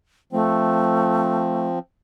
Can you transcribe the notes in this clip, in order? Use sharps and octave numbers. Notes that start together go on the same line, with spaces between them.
F3 A3 C4